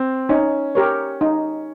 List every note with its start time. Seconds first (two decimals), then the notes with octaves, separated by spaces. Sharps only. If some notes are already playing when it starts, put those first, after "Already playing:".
Already playing: C4
0.29 C#4 D#4
0.75 G4 A#4 C#5
1.21 D#4